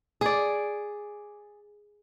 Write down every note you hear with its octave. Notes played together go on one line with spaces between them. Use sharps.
G#4 D5